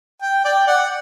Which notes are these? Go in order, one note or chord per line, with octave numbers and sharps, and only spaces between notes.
G5
D5 G5
D5 F#5